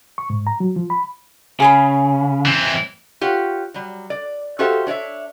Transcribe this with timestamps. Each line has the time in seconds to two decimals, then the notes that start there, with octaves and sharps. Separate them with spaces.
0.18 C#6
0.30 G#2
0.47 A#5
0.60 F#3
0.76 F3
0.90 B5
1.60 C#3 G#4 C#5 B5
2.45 E3 C4
3.21 F4 G4 C#5 F#5
3.74 F#3 G3
4.10 D5
4.59 F#4 G4 A4 C5 E5 F5
4.87 D4 C#5 D5 E5